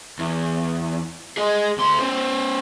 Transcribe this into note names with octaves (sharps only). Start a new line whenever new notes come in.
E2
G#4 D#5
D2 C6
C#4 C5